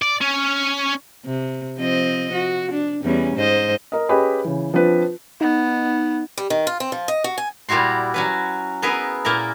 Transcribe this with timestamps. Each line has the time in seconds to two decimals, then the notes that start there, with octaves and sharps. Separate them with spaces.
0.02 D5
0.22 C#4
1.26 C3
1.78 F3 C4 D#5
2.33 F#4
2.72 D4
3.03 E2 G3 C#4
3.37 G#2 C5 D#5
3.92 A#4 D#5
4.09 C#4 G4 G#4 B4 D#5 B5
4.45 C#3 E3
4.74 F3 C4 D4 F4 B4
5.41 B3 D#4
6.37 G3
6.50 D#3
6.67 F4
6.80 C4
6.92 F3
7.08 D#5
7.24 F#4
7.38 G#5
7.69 A#2 G3 E4 F#4 C6
8.14 F#3 C#4 B4
8.82 B3 G#4 A#4 B4 E5
9.25 A#2 A#3 E4 A#4